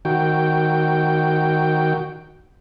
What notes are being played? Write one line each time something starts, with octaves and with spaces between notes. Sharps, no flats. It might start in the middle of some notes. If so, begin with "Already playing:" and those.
D#3 F#4 G5